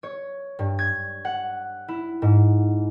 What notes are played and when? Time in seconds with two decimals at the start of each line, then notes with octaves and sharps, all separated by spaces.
0.03 C#5
0.59 G2
0.79 G#6
1.25 F#5
1.88 E4
2.22 G#2